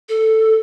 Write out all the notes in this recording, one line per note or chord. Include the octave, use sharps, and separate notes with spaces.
A4